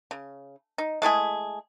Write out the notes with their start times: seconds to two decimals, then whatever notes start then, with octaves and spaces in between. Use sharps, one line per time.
0.11 C#3
0.78 D#4
1.02 G#3 A3 E4 G#4